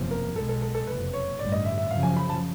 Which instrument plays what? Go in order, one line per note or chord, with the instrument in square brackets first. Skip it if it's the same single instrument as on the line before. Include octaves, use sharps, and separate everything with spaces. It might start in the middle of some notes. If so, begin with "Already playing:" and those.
Already playing: [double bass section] F#1 E2 C3 F3
[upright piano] A#4
[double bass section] B1 B2 G#3 [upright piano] A4
[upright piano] A4
A4
A4
[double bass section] F#1 F2 C3 [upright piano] B4
[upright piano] C#5
[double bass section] A1 G2 D3 G3 [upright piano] D5
[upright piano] D#5
E5
E5
[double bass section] F#2 C#3 F3 [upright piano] F5
[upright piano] G#5
B5
A5